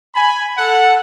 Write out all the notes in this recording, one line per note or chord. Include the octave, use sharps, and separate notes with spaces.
G#5 B5
A4 F#5